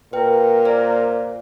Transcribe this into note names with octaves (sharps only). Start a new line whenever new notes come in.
A#2 A#4 B4 G5
C5 D5